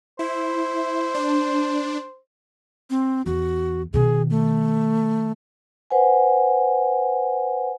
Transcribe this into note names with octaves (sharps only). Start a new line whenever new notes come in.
E4 C5
D4
C4
E2 F#4
B2 D#3 G#4
A3
B4 C5 F#5 G#5